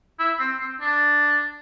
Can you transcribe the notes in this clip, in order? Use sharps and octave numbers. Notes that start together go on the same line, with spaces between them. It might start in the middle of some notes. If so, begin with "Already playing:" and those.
E4
C4
C4
D4